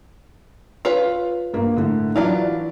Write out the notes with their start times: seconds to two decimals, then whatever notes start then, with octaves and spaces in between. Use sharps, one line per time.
0.85 F4 B4 C#5
1.53 G2 A#3
1.77 A2 D3
2.16 E3 F#3 D4 E4 F4